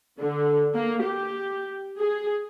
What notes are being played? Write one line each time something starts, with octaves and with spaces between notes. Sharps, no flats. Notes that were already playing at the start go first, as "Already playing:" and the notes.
D3
A#3
G4
G#4